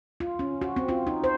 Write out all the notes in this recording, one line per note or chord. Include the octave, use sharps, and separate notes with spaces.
F4
C#4
F#4
C4
F4
D#4
C5